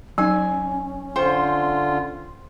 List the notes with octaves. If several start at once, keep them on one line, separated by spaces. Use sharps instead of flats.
F#3 C#4 D#4 G#5
D3 F4 C5 G5 C#6